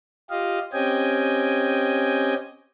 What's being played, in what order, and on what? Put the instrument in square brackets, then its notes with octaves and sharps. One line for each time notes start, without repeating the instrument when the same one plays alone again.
[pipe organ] F4 G4 D#5 F5
C4 C#4 G4 D#5 G5 G#5